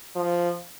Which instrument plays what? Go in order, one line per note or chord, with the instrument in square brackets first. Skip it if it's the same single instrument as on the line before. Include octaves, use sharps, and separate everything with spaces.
[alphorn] F3